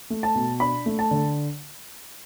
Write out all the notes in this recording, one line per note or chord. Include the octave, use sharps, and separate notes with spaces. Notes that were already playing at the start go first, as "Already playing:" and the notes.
A3
A5
B2
D4 B5
A3
A5
D3